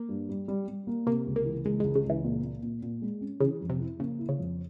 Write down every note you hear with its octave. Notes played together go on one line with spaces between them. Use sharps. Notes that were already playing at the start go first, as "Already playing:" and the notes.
Already playing: A#3
G2
G3
G3
G3
A#3
C3 A#3
C#2
A#3
E3
C#2 G#3
G#3
C#2
C#3
C#2 E3
A#2
A#2
A#2
A#2
G#3
C#4
C#3 E3
F2
C3
E4
C#3 A#3
E4
C#3
F2